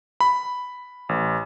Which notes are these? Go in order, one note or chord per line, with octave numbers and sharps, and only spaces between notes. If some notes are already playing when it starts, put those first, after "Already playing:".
B5
A1